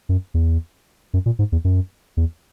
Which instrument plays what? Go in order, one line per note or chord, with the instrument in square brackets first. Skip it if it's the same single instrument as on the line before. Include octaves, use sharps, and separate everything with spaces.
[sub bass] F#2
E2
F#2
A#2
G#2
E2
F#2
E2